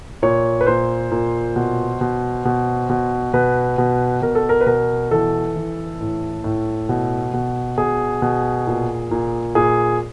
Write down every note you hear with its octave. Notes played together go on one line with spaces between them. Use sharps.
A#2 C#5
B4
A#2 C5
A#2
B2
B2
B2
B2
B2 B4
B2
B2 A#4
A4
A#4
B4
B2 A#4
E3 A4
E3
A2
A2
B2
B2
B2 G#4
B2
A#2
A#2
A#2 G#4